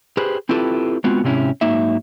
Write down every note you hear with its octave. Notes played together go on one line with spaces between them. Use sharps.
G4 G#4 B4 C5
C4 E4 F4 G4 A4 B4
G#3 B3 C4 F4 F#4
G#2 C3 C4 C#4 E4
G#2 F#3 A#3 D#4 E5